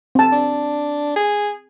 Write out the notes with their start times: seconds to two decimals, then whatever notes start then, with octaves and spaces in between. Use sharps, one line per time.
0.15 C4 A5
0.32 D4
1.16 G#4